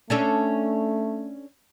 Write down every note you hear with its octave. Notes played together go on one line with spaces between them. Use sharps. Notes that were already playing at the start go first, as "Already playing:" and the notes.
A3 C#4 D4 A4